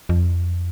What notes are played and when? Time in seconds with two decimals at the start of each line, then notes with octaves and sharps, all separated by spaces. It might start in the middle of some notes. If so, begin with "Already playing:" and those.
0.09 F2